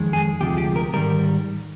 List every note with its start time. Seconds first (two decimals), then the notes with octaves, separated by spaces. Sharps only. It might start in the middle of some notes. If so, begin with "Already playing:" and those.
Already playing: F2 D#3 G#3
0.13 G#4
0.40 D2 C3 F3 G#3 G4
0.58 G4
0.76 A#4
0.94 G#2 D#3 G3 A#4